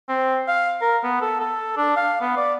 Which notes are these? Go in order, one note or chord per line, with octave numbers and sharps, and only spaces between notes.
C4
F5
A#4
B3
A4
A4
D4
F5
B3
D5